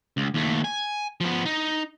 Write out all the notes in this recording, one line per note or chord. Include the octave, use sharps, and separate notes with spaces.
C#2
D#2 A3
G#5
F3 B3
D#4